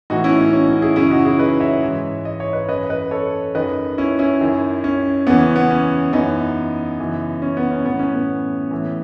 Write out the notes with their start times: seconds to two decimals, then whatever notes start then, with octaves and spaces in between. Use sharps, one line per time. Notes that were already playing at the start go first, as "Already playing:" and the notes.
0.10 A2 E3 D#4 F#4
0.24 C#4 E4
0.39 C#4
0.53 C#4
0.68 C#4
0.82 E4 G#4
0.96 F#2 C#3 E3 C#4 E4
1.11 D#4 F#4
1.25 E4 G#4
1.39 B4 D#5
1.60 C#5 E5
1.82 G#2 E3
2.25 D#5
2.40 C#5
2.53 B4 D#5
2.69 F#2 E3 B4 D#5
2.90 B4 D#5
3.11 A4 C#5
3.55 F#2 D#3 B4 D#5
3.98 C#4 E4
4.19 C#4 E4
4.41 F#2 D#3
4.84 C#4
5.27 E2 C#3 E3 B3
5.41 C#4
5.56 B3
5.70 C#4
6.13 F#2 E3 B3 D#4
6.99 F#2 C#3 E3
7.42 C#4
7.57 B3
7.71 C#4
7.85 A2 E3 B3
7.99 C#4
8.15 B3
8.71 A2 E3